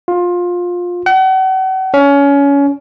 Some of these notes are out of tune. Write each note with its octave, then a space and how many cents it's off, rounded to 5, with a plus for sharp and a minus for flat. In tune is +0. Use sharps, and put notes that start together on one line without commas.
F4 +20
F#5 +40
C#4 +25